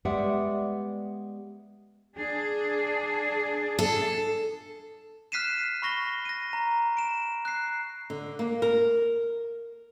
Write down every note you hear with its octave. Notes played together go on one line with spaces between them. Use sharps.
G3 G#3 B3 D5 E5 F#5
D4 G#4
A4
F6 F#6 B6 C7 D#7 E7
B5 C#6 A#6 G7
A#6 D#7
A#5
D7 E7
F#6 C7
D3
A#3
A#4